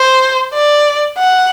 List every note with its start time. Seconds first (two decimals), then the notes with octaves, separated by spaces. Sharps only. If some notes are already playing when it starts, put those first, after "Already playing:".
Already playing: C5
0.54 D5
1.18 F#5